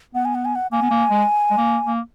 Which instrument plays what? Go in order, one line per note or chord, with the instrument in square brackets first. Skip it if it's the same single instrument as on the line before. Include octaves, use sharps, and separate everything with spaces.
[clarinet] B3 [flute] F#5
[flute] G#5
F#5
G#5
F#5
[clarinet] A#3 [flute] G#5
[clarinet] B3
A#3
G#3
G#3
A#3
A#3